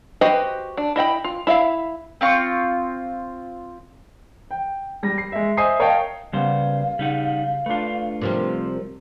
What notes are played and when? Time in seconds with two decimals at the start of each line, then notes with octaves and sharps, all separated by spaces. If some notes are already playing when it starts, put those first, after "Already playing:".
0.21 F#4 G4 B4 C5 D#5
0.77 D4
0.96 E4 D#5 G5 B5
1.24 F4
1.47 E4 E5 F5
2.21 C4 F4 C#6
4.51 G5
5.03 G3 A#6
5.18 C7
5.32 G#3 E5
5.57 C5 D#5 E5 G#5 D#6 C7
5.79 A#4 C#5 D#5 F5 G5 A5
6.33 C#3 G3 A#3 B3 C5 F5
6.99 C#3 G3 D#4 F#5
7.66 A3 D4 F4 B4
8.22 C3 F3 G3 A#4